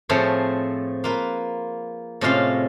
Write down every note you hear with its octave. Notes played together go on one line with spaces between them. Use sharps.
A2 F3 A3 C4 G#4 C#5
A#3 F4 B4
A2 C3 G#3 C#4 F4 F5